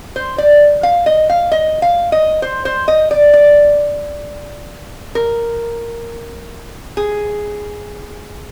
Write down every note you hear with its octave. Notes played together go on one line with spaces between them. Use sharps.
C5
D5
F5
D#5
F5
D#5
F5
D#5
C5
C5
D#5
D5
D5
A#4
G#4